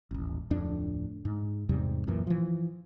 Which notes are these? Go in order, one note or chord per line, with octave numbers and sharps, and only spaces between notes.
D#1 A1
D1 F2 A2 D4
G#2
E2 G#2 C3 G3
D1 F#2 A#2 E3
E3 F3